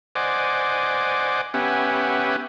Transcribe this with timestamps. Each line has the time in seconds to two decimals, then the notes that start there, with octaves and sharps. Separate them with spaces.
0.15 C5 D5 D#5 F#5 G#5 D6
1.54 B3 C#4 G4 E5 F#5 G#5